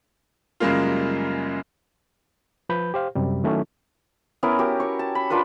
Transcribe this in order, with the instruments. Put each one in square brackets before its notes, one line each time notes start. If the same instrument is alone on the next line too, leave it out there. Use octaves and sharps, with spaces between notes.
[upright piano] F#2 C#3 G3 G#3 A#3 F4
[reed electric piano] F3 B4 B5 G6
G4 C5 F5
F#2 C3 G3
D#3 F#3 A3 C#4 E4
[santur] B3 C#4 E4 A#4
F#4 G4 A#4
C#5 C#6
A5
B5
D4 F4 A#4 B4